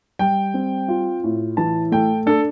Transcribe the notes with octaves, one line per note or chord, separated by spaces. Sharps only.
G3 G5
C4
F4
A2
E3 A5
A3 G5
D4 A4